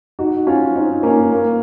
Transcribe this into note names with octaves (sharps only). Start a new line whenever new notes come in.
D#4 F#4
C#4 F4
C4 D#4
A#3 C#4
A#3